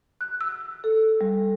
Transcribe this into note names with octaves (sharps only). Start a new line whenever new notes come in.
F#6
E6
A4
G3